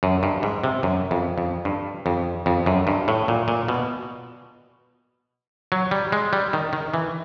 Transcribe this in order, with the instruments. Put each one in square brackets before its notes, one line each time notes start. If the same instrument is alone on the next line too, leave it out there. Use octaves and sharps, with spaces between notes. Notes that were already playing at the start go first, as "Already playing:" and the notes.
[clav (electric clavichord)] F#2
G2
G#2
C3
F#2
F2
F2
G2
F2
F2
F#2
G2
A2
A#2
A#2
B2
F#3
G3
G#3
G3
D#3
D#3
E3